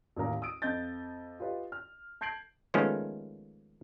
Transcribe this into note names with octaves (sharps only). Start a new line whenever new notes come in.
A1 D#2 A#4 F5
D#6 E6 D7
F2 D#5 G6 A6
F4 G4 B4 D#5
F6
A5 G6 G#6 C7 D7 F#7
D#3 F3 G#3 A3 B3 C#4